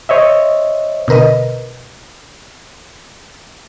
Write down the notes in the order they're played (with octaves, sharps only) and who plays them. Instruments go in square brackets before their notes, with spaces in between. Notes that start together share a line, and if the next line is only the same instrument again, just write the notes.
[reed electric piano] C5 C#5 D#5 E5
[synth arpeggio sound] B2 D3 A#4 B4 D#5